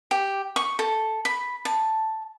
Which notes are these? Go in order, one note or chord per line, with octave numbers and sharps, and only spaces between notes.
G4
C#6
A4
B5
A5